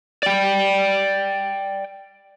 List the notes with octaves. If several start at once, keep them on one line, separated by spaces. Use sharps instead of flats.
D5 G5